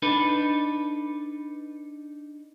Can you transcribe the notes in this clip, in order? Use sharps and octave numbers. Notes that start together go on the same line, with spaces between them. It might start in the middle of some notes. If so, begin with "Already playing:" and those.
D4 D#4 A4 B4